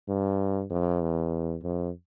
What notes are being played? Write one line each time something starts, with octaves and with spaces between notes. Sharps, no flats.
G2
F2
E2
F2